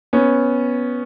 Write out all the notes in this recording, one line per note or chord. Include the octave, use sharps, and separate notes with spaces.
B3 C#4